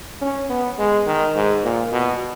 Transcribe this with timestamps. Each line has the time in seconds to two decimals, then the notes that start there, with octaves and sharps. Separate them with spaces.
0.21 C#4
0.50 B3
0.78 G#3
1.07 D#3
1.35 G#2
1.64 A#2
1.92 B2